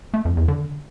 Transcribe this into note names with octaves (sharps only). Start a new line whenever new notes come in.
A3
F2
E2
D3